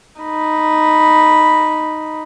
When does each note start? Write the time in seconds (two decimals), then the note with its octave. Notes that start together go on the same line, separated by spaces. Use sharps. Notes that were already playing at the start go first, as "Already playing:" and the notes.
0.21 D#4 B5